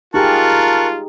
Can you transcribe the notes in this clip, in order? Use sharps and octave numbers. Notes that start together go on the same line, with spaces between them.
D#4 F4 G4 G#4 A#4 A5 C#6 F#6